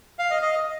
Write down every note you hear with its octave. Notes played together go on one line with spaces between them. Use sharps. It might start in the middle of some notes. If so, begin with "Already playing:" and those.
F5
D#5
D#5